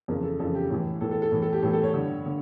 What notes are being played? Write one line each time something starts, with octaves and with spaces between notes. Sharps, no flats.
F2 C#3 E3 A#4
A4
F2 C#3 E3 A4
G4
A2 E3
A2 E3 A4
A4
A4
A2 E3
A4
G4
A2 E3 A4
A4
C#5
G2 D3
D3